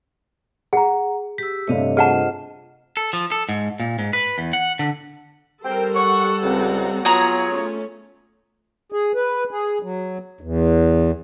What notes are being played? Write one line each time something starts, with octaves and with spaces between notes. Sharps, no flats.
G#4 F#5 A#5
G4 E6 B6
G2 C3 A3 C#5 D#5 F5
F4 G#4 C5 D#5 F#5 A5 F6 E7
A4
F3
A4
G#2
A#2
G#2
B4
E2
F#5
D3
G3 C4 A4 A#4 C5 G5
F#5 C#6
C#2 C4 F#5 A#5
F#3 B3 F4 G#4 C#5 A#5
A3 C#4
G#4
B4
G#4
F#3
E2